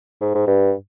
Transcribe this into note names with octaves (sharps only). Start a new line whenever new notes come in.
G#2
G#2
G2